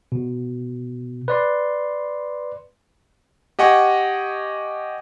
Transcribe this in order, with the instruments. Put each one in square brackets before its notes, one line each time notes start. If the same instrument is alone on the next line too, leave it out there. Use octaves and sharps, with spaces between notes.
[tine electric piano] B2
B4 D5 C6
[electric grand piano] G4 D#5 F#5 G#5 C#6